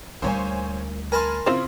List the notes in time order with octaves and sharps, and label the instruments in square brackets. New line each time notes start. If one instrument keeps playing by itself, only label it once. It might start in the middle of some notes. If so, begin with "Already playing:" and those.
[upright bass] D2 G3 [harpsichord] A#2 [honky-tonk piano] C5 C#5 G#5
[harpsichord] A#4 A5 C6 [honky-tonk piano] G#5 B5 F6
[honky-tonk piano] C#3 E4 [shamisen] C4 F4 C5